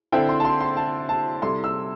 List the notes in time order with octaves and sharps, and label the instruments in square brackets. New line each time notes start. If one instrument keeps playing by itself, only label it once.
[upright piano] D3 C4 E4 A4 C5 [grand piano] G5
[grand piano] C6
A5
C6
C6
A5
A5
[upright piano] C3 G3 E4 A4 [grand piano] C6
[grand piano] E6